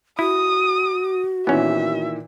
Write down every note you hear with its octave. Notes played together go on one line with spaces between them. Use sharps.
E4 F#4 D#6
A#2 D#3 E3 B3 C#4 E5